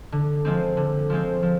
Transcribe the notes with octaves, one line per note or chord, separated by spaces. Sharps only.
D3
F3 G#3 C4
D3
F3 G#3 C4
F3